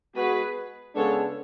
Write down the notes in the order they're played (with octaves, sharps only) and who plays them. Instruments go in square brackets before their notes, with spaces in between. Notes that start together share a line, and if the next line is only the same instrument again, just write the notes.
[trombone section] G#3 B3 F#4 [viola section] G#4 B4
[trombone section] C#3 G#3 B3 D4 [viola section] A4 C#5